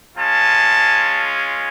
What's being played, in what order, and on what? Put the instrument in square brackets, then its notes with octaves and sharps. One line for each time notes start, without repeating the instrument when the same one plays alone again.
[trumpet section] G#3 C#4 F4 A5